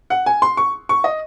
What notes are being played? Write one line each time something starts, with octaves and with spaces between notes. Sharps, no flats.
F#5
G#5
C6
C#6
C#6
D#5